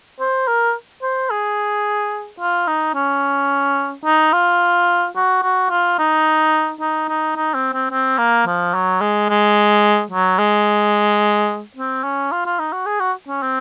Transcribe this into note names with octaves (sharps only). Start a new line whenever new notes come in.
C5
A#4
C5
G#4
F4
D#4
C#4
D#4
F4
F#4
F#4
F4
D#4
D#4
D#4
D#4
C4
C4
C4
A#3
F3
F#3
G#3
G#3
F#3
G#3
C4
C#4
F4
F4
D#4
F#4
G#4
F#4
C#4
C4